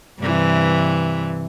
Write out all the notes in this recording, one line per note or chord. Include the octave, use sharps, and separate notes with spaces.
G2 C3 E3